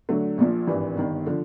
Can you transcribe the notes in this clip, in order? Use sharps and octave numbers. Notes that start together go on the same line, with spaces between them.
D3 F#3 A3 D4
A#1 A#2 F3
G#1 G2 E3
G1 G2 D#3
D3 F3